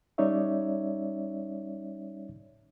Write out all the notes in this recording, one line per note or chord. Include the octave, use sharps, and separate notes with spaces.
G3 C#4 D#4 C#5 D5 E5